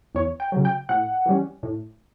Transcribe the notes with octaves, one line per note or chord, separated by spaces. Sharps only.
E2 C#5
G5
C#3 F#3
G5
A2 F#5
E3 G3 C#4
A2